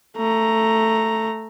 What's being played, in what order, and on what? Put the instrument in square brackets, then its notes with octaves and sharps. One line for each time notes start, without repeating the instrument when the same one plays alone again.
[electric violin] A3 A#5